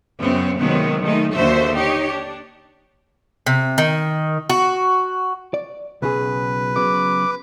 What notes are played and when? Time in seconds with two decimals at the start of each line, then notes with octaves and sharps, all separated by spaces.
0.19 F#2 C#3 B3 C4
0.58 C3 D#3 F#3 G#3 A#3 B3
1.01 D#3 G#3 A3 D#4
1.33 D#2 D3 F#4 C5 E5
1.74 D#4 G4 C#5
2.08 D4
3.46 C3
3.78 D#3
4.50 F#4
5.54 D5
6.02 B1 C#3 G#4 B4
6.76 C#3 F#3 B3 D6